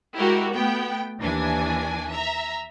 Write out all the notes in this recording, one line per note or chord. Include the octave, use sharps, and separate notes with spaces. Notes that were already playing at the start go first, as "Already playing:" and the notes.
G#3 E4 F#4 G4 A#4
A3 B3 G5
D#2 E3 D4 G#5
E5 A#5